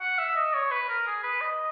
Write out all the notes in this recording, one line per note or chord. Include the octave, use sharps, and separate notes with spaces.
F#5
E5
D#5
C#5
B4
A#4
G#4
B4
D#5